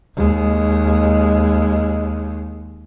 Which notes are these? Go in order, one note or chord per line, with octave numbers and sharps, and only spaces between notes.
D#2 G#3